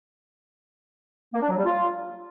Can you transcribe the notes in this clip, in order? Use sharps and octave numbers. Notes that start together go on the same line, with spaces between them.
A#3
D4
F#3
G3
F4